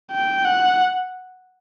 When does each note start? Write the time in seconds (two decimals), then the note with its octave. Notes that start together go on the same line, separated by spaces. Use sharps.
0.11 G5
0.45 F#5